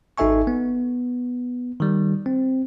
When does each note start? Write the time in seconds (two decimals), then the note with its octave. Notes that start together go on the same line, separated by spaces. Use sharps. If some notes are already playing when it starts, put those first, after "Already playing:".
0.18 G#1 D#4 A4 E5 G#5 C#6
0.47 B3
1.80 D#3 G3
2.26 C4